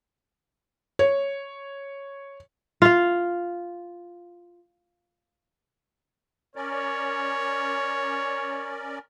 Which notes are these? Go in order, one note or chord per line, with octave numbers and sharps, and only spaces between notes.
C#5
F4 F5
C#4 A#4 C#5 D5